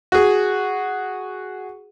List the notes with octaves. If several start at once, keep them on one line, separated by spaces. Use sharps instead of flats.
F#4 G#4